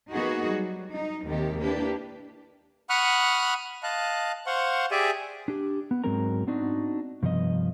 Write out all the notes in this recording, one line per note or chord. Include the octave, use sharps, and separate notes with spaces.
A#3 B3 D#4 F#4 G#4 B4
F#3 G3
D#4
D#2 C3 D#3 G4
A#3 D4 E4 G4 B4
F#5 B5 C#6 D#6 F6 F#6
D#5 F5 A5 F#6
C5 F5 F#5 C6 C#6
G4 G#4 D5 E5 G#5
D4 G4
B3
G#2 F#3 G#3 C4 A#4 A#5
B3 C4 D4 D#4 F#4
G2 C3 F3 B3 D#5